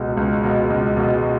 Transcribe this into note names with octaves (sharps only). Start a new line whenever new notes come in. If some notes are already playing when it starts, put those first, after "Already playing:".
Already playing: C#2 B2 G#3
C#2
B2 G#3
C#2
B2 G#3